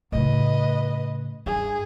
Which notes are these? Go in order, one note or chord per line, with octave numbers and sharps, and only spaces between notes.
A2 C#3 B4 D#5
G2 G#4